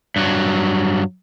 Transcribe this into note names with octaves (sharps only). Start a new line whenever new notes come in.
G2 F#3